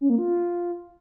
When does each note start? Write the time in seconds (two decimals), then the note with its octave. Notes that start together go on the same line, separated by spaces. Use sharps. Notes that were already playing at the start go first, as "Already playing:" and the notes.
0.01 C#4
0.10 A#3
0.18 F4